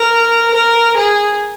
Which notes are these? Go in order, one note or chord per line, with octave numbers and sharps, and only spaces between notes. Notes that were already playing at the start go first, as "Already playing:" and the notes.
Already playing: A#4
A#4
G#4